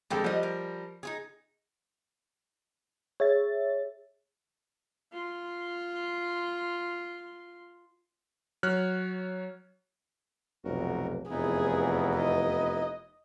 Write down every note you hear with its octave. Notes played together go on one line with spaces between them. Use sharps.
F2 D3 D#3 G#3 G4 A4
F3 G3 D#5 F#5
A#4
D#4 F4 G#4
G#4 C#5 E5 A6
F4 C6
F#3 C#5 F6 F#6
F1 B1 F#4 A#4
F1 E2 B3 D#4 E4 G#4
D#5